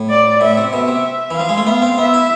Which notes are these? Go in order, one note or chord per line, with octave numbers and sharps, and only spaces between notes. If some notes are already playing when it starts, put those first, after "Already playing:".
Already playing: A2
D5
A2 E5
C3
B2 E5
C3
E3
F3 F5
G#3
A3
B3 F5
C4
B3 E5
E4